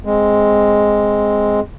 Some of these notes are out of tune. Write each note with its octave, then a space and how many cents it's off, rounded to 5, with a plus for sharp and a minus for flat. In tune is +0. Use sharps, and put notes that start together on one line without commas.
G#3 +0 C4 +0